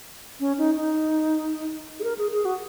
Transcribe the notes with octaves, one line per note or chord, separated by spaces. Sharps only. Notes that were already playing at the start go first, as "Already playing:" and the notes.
C#4
D#4
D#4
G#4
A#4
G#4
G#4
F#4